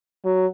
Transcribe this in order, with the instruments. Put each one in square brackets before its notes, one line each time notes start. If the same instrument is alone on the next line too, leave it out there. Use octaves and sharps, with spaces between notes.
[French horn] F#3